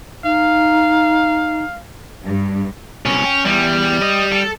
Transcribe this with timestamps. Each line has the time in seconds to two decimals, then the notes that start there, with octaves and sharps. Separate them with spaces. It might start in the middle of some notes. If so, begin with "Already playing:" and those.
0.25 D#4 F5
2.23 G2
3.05 C2 B2 C#4
3.25 G5
3.45 E2 G3
4.02 D#5
4.32 A4